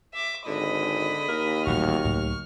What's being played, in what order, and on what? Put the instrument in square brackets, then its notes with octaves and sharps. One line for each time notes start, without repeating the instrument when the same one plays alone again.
[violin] E5 D6
[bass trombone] G#1 [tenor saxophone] D3 [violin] D#5 B5
[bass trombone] D#2 [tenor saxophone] A#4
[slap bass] D#1 A1 G3 [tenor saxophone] F#4 [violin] C#6 F6
[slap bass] C#2 A2 F#3